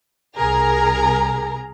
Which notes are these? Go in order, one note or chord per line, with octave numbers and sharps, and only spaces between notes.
C2 G#4 A#4 A#5